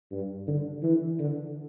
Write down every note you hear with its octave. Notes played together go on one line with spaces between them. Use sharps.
G2
D3
E3
D3